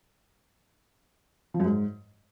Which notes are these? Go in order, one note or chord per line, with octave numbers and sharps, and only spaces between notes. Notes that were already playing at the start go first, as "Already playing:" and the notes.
F3
F#2
G#2